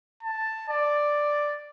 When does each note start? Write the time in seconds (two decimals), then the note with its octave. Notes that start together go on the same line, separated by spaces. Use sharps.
0.23 A5
0.69 D5